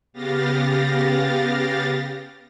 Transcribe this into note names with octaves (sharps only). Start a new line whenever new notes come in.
C#3 B3 G4 F5 A6 A#6